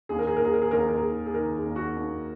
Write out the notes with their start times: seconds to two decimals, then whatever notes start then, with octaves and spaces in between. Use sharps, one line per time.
0.09 D#2 G#4
0.19 A#4
0.27 G#4
0.37 A#4
0.41 D#2 G#4
0.54 A#4
0.62 G#4
0.71 D#2 A#4
0.80 G#4
0.89 A#4
0.97 G#4
1.03 D#3
1.26 G#4
1.34 D#3 A#4
1.55 G#4
1.66 D#2
1.76 F#4
1.97 D#2